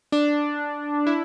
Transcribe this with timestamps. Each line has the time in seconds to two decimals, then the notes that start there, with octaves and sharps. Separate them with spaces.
0.12 D4
1.06 E4